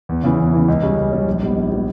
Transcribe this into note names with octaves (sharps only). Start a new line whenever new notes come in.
E2
C#3 E3
E2
C#3 E3
C#2
C#3 G3 C#4
C#2
C#3 G3 C#4
A#1
G#2 G3 B3
A#1
G3 B3